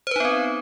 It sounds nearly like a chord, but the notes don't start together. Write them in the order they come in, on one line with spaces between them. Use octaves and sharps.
C5 B4 D#4 B3 C4